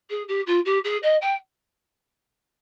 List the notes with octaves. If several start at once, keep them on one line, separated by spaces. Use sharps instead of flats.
G#4
G4
F4
G4
G#4
D#5
G5